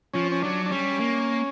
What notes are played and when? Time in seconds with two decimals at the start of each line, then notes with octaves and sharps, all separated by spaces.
0.14 F3 C#4
0.32 C#4
0.42 F#3 D4
0.66 D4
0.71 G3 C#4
1.00 A#3